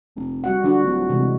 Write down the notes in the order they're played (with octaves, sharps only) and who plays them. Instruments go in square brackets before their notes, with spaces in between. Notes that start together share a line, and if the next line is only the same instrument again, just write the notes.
[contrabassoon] F1
[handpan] G3 F#4 F#5
[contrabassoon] D3 [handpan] F3 F#4
[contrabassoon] D1
[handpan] C3 E3 G#3